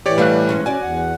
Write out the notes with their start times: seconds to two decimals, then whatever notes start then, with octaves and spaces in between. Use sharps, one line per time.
0.06 A2 E3 G4 C#5 D5
0.18 G3 A3 B4 D5 F5 F#6
0.49 G#2 G#3 C#4
0.66 C#4 F#4 D5 G#5
0.82 E2 F#5